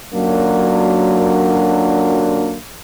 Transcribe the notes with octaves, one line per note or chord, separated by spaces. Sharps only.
F#2 A#2 D3 F#3 A#3 D4